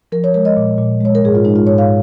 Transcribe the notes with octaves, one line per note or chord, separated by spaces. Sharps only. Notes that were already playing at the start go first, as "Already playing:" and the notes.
F3 A#4
C#5
G#3 A#4
D#5
A#2
A#2
G#3 C#5
A#4
G#2 G#4
F4
G#3 D#4
F4
G#2 C#5
F5